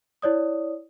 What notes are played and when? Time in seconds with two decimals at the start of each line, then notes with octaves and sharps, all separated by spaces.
0.22 E4 C#5 D5 D#6